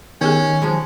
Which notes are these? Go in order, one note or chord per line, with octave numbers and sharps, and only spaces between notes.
D#3 B3 C#4 G4 G#4
F3 F#3 G#3